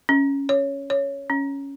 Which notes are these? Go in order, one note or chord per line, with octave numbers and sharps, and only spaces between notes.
C#4
C#5
C#5
C#4